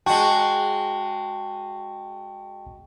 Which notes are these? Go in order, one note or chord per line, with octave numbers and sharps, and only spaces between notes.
G#3 F#4 G5 A5 C#6